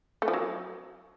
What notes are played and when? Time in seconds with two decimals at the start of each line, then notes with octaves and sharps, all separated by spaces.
0.22 A3
0.28 F3
0.33 F#3